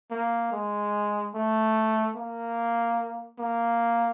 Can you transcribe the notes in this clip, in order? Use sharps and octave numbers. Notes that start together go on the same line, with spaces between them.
A#3
G#3
A3
A#3
A#3